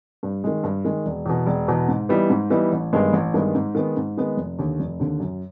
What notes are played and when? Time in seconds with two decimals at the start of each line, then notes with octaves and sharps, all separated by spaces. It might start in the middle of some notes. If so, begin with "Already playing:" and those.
0.23 G2
0.44 D#3 G#3
0.64 G2
0.85 D#3 G#3
1.06 E1
1.26 E2 B2
1.46 E1
1.68 E2 B2
1.89 G#2
2.09 E3 G3 B3 D#4
2.30 G#2
2.50 E3 G3 B3 D#4
2.72 A1
2.93 G2 D#3 G#3 B3
3.13 A1
3.34 G2 D#3 G#3 B3
3.55 G#2
3.75 D#3 G#3 B3
3.97 G#2
4.17 D#3 G#3 B3
4.37 F1
4.59 D#2 D3
4.79 F1
5.00 D#2 D3
5.20 F#2